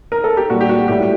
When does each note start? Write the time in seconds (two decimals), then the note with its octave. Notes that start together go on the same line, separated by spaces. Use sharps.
0.12 A#4
0.24 A4
0.37 G4
0.50 A#2 G3 F#4
0.61 G4
0.69 F#4
0.88 A2 G3 G4